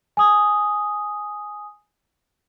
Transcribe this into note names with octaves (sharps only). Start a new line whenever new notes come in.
G#5 D#6